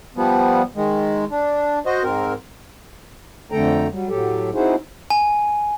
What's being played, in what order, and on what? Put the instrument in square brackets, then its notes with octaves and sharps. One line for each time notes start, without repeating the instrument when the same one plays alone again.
[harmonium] F3 G3 B3
D#3 G#3
D4
F#4 C5 D#5
G#2 C4 A#4
F2 D3 A3 A4 G5 A#5
F#3 G3
A2 F#3 G4 A4
C4 D#4 E4 F#4 G#4 C5
[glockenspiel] G#5